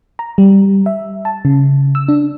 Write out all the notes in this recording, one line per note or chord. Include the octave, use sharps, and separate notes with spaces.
A#5
G3
E5
A5
C#3
E6
D4